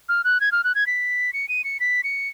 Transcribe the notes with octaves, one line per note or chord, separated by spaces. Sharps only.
F6
F#6
G#6
F6
F#6
G#6
B6
C#7
D#7
C#7
B6
C#7